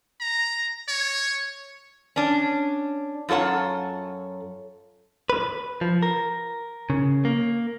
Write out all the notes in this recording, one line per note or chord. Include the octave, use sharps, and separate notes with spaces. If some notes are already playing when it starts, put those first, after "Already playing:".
A#5
C#5
C#4 D4
F#2 F4 A4 C#5 F#5
B4
F3
A#4
C#3
A#3